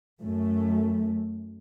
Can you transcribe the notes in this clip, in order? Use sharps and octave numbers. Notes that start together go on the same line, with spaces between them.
F#2 A3